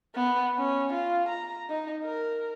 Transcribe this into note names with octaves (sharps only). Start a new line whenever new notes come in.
B3
C#4
F4
A#5
D#4
A#4